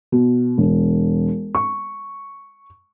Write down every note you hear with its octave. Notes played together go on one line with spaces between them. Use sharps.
B2
E1
C#6